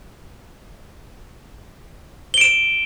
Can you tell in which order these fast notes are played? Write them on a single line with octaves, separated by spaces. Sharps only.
G7 D7 E7